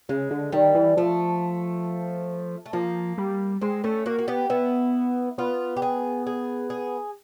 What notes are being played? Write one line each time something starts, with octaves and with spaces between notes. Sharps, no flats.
C#3 G#3
D3
D#3 G3
E3
F3 A3
A3
F3 A#3
G3
G#3 C4
A3 C#4
A#3 F#4
F#4
B3 G4
B3 E4
B3 F4
G4
G#4
G#4
G#4